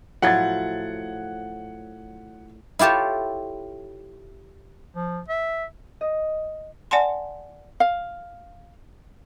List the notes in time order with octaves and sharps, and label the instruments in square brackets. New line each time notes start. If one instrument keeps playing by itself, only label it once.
[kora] A2 F3 F#3 [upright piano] F#5 G#6 A6
[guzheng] E4 F4 G4 A4 C#5
[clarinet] F3
E5
[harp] D#5
[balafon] D5 F#5 G#5 A5 C6
[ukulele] F5